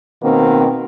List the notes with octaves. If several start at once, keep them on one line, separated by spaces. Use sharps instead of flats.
B2 D#3 A#3 C4